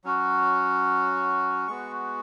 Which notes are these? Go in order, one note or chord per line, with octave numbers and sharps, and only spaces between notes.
F#3 C#4 F#4
G#3 B3 F#4 C#6